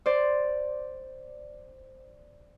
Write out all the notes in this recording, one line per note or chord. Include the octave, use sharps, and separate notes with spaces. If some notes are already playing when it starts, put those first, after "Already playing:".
C5 D5